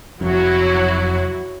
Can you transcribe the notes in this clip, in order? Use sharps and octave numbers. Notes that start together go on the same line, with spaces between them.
F1 F2 F#3 E4 F#4